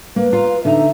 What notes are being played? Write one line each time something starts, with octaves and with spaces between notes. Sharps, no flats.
A#3 B4
F4 F5 A#5
D3 D#4 E5 A#5